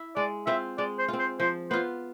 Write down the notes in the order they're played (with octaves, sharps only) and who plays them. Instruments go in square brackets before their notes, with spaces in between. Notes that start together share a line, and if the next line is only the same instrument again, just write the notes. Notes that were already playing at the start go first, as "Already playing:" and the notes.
Already playing: [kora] E4
[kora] G#3 [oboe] D5
[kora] C4 F4 [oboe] E5
[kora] G#3 [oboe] D5
[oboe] C5
[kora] C4 F4
[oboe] C5
[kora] F3 [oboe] C5
[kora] B3 F4 [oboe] C5